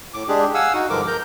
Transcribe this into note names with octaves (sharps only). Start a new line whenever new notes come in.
A2 D6
G#3 D4 G4 G#4
F5 F#5 G#5 E6
D#4 F#4
G2 D3 F3 G#3 A#4 D6
A#4 A#5 G6